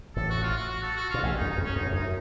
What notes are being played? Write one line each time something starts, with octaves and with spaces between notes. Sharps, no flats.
A1 A2 A4
F#4
F4
F#4
F#4
A4
F#4
A#2 F4
A1 A2 C#4
D#4
F#2
D#4
F2
C#4
F#2 D#4
A2
F#2 D#4